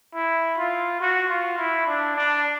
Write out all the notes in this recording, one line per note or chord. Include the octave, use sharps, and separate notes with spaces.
E4
F4
F#4
F4
E4
D4
D4